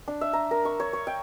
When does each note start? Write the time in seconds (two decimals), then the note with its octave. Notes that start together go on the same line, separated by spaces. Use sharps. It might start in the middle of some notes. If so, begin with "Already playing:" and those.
0.08 D4
0.21 E5
0.33 A#5
0.51 A#4
0.65 C#6
0.80 C#5
0.93 C#5
1.07 G5